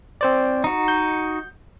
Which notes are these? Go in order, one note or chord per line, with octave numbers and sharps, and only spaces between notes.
C4 C5 D5
D#4 F#4
G6